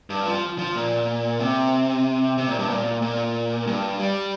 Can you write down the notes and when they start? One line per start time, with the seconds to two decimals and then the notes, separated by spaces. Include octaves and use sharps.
0.10 G2
0.26 F3
0.58 F3
0.75 A#2
1.40 C3
2.37 C3
2.48 A#2
2.59 G2
2.70 A#2
3.02 A#2
3.67 G2
4.00 G3